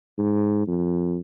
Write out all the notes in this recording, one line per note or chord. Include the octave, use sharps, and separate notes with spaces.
G#2
F2